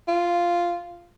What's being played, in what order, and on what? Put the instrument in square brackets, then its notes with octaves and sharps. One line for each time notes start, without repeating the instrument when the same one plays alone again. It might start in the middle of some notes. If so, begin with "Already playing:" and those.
[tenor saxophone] F4